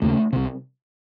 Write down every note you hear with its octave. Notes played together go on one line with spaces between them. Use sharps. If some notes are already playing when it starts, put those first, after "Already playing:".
D#2 C#3 A3
C2 C3